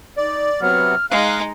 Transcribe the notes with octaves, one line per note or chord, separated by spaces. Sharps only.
D#4 D5
C3 F#3 B3 F6
G#3 D#4 F5 A#5 F#6